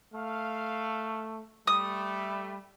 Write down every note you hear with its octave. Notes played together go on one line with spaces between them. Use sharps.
A3 F5
G3 A3 D#6